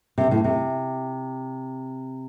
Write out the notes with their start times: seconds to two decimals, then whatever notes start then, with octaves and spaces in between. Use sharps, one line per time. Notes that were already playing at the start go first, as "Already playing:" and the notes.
0.18 C3
0.31 A2
0.44 C3